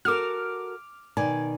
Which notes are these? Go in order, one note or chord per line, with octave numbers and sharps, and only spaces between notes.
F#4 A4 A#4 D6 F6
B2 D#3 D5 G#5